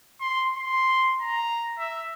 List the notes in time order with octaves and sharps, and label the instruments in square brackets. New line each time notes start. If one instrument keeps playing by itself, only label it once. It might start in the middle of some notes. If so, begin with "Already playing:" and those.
[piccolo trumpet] C6
C6
A#5
E5